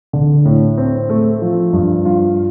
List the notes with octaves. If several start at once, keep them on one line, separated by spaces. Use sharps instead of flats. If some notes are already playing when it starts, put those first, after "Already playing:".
D3
A2
C4
A3
F3
G2
F4